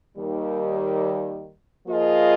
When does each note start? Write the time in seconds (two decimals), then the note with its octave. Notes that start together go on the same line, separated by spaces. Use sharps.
0.17 D#2 D#3 G3
1.87 F3 A#3 F4 G#4 D#5